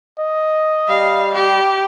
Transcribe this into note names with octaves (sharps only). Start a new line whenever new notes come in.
D#5
G3 F5
G4